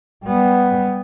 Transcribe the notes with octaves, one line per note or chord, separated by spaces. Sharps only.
G3 B3